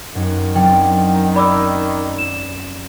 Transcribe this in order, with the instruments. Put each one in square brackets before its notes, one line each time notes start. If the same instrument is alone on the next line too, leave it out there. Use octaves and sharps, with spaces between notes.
[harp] F#2 F#4 [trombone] D#3
[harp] F#3 C4 D4 [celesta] G5
[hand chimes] D5 [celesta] B5 D6 E6
[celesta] E7